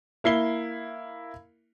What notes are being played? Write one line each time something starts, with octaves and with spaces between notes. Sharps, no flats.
A#3 E4 C7 G7